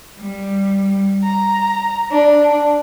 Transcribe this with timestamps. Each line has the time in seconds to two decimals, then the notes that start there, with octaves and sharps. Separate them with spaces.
0.17 G3
1.23 A#5
2.11 D4